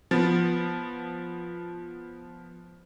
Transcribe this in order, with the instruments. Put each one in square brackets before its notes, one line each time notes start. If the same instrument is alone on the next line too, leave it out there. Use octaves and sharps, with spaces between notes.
[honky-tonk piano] F3 B3